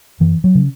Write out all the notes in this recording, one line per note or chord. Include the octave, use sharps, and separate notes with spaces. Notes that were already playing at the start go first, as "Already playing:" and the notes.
F#2 E3
F#3
C#3